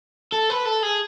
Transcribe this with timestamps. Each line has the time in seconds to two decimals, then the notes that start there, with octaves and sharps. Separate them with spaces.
0.32 A4
0.50 B4
0.66 A4
0.83 G#4